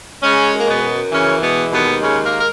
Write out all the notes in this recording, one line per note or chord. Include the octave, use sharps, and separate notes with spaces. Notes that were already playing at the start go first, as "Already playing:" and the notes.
C#3 G#3 C#4
F#2
A#3
B2 B3
F#2
C#3 E3 C#4
B2 G#3 B3
D#2 B2 B3
C#3 G#3 C#4
A#3 A#4
A#4